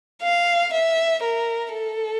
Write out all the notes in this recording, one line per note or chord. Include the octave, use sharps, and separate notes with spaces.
F5
E5
A#4
A4